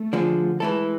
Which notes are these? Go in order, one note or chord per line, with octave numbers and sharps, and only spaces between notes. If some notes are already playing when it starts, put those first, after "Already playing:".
Already playing: A3
D3 F3 G#3
E3 G#3 A3 E4 A4